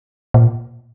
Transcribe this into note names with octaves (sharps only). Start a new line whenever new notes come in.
A#2